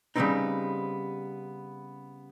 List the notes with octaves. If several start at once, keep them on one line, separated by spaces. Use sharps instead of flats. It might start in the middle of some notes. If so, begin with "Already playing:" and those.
C#3 G3 G#3 B3 C4 D#4